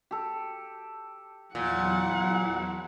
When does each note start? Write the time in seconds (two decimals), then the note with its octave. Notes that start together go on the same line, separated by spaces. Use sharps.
0.11 G4 A4
1.55 E2 A#2 F#3 E4 F#5